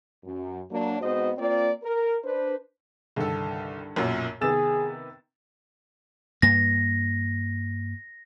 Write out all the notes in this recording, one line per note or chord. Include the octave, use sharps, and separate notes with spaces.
F#2
F#3 A#3 D4
G#2 B3 C4 F#4 C5 D#5
A#3 C4 F4 D5
A#4
D4 B4 C5
C2 G2 D3 D#3 A4
B1 F#2 A#2 F#4 A#4 C#5
C3 D#3 B3 G#4 E6 A6 E7
G2 A#3 A#6